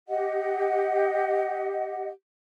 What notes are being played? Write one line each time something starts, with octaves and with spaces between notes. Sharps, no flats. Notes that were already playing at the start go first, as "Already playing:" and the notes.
G4 D#5 F#5